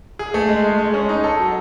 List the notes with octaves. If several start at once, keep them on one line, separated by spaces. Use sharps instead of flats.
G#4
A3
G#3
G#3
G#3
C#4
D#4
A4
F#3